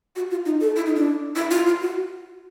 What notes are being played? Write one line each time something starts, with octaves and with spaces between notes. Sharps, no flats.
F#4
F4
D#4
A4
E4
D#4
D4
E4
F4
F4
F#4